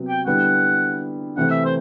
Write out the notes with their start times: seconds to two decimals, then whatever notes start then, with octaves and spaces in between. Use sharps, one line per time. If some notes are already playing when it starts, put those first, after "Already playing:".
Already playing: C3 F#3 B3
0.09 G5
0.27 D3 G3 B3 E4 F#5
1.37 C3 E3 A3 C4 F#5
1.50 E5
1.65 C5